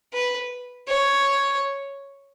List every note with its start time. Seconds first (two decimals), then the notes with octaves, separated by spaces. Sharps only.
0.13 B4
0.88 C#5